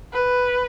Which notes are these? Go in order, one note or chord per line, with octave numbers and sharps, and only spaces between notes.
B4